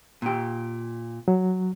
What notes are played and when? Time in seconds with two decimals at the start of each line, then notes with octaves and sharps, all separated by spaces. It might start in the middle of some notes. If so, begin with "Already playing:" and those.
0.22 A#2 G4
1.28 F#3